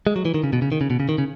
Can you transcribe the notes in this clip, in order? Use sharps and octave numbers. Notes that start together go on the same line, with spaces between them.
G#3
F#3
E3
D#3
C#3
B2
C#3
D#3
C#3
B2
C#3
D#3
C#3